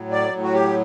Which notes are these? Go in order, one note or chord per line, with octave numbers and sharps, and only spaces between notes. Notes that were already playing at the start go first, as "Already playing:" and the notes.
Already playing: A2 F#3
D5
A2
F#4
G4